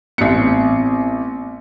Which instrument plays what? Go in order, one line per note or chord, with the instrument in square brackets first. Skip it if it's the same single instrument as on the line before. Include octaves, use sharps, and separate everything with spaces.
[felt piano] A1 C#7 [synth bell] B3 C4